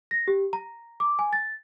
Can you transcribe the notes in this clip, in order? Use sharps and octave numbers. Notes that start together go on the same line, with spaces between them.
A#6
G4
A#5
D6
G#5
A6